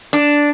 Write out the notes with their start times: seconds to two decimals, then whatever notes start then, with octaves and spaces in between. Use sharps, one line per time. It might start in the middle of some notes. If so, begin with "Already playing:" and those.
0.13 D4